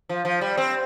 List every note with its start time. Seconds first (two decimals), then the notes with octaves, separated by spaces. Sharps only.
0.09 F3
0.25 F3
0.41 G3
0.57 C4